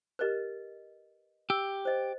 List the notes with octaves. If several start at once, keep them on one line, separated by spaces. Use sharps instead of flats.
G4 A#4 B4 D#5 F#6
G4 E6
C5 D#5